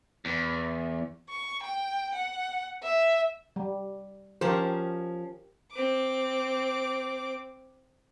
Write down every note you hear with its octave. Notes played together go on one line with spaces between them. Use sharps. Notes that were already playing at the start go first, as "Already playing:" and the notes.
E2
C#6
G5
F#5
E5
G3
F3 C#4 G4 A#4 C5
C4 D6